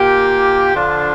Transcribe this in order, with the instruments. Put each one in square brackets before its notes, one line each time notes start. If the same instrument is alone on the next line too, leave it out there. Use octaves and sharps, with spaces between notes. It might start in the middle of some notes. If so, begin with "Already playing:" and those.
Already playing: [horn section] A#2 A#3 G4
D3 F3 D4 F4